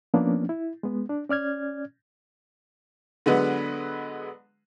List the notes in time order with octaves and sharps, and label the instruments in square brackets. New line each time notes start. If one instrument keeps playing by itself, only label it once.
[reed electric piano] F3 A#3 B3 C#4 D4
E4
G#3 B3
D4
C#4 D5 F6 G#6
[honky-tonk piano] D3 F#3 G#3 B3 B4